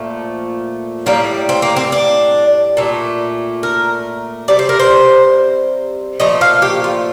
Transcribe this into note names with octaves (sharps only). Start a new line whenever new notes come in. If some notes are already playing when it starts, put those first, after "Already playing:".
Already playing: A#2 F3 A3
A2 G3 A#3
C4
A#3
C4
D4
A#2 A3
A#4
C3 G3 D5
C5
A#4
C5
A#2 F3 A3 D#5
F5
G4
F4